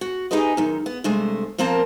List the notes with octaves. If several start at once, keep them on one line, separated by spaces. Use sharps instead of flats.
F#4
D#4 G4 G#4 B4 D#5
F#2 D#3
B3
G2 C3 G#3 A3 C5
F3 A#3 C4 A#4 A5